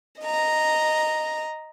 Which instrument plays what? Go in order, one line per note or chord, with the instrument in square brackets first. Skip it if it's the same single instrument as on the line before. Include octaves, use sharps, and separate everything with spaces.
[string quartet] D#5 A#5